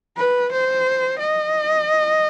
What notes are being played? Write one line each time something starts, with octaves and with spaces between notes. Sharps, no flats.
B4
C5
D#5